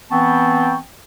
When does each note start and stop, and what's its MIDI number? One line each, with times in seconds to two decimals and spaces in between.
0.11 0.77 52
0.11 0.77 59
0.11 0.77 60
0.11 0.77 79
0.11 0.77 81
0.11 0.77 85